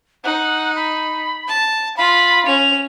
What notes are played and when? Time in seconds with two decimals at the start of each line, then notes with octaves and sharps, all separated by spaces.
0.24 D#4 F#5
0.76 B5
1.48 A5
1.97 F4 F5 B5
2.46 C#4 F7